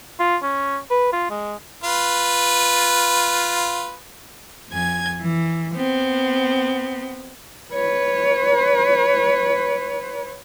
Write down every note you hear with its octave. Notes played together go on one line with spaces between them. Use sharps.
F4
C#4
B4
F4
G#3
F4 B4
F2 G#5 G#6
E3
B3 C4
B4 C#5